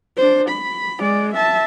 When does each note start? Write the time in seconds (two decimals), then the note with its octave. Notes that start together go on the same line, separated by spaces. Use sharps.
0.17 D4 C5
0.49 B5
0.99 G#3 D5
1.34 E5 A5